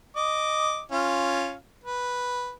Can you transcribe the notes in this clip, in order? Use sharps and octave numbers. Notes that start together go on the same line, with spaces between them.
D#5 D6
C#4 F4 F5
B4